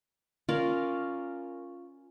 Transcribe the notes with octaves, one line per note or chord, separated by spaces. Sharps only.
C#4 F4 A#4 D5